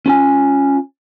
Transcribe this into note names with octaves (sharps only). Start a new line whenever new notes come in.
C#4 F4 G#5